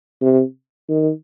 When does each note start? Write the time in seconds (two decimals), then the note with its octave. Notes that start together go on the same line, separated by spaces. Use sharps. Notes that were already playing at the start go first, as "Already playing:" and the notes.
0.21 C3
0.89 D#3